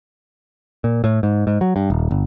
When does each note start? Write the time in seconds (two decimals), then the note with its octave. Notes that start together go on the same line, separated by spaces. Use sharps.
0.84 A#2
1.04 A2
1.23 G#2
1.47 G#2
1.61 F#3
1.76 G2
1.90 D#1
2.11 G1